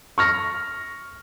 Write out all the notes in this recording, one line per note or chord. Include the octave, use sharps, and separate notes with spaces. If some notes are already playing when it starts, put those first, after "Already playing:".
C#6 F6 A#6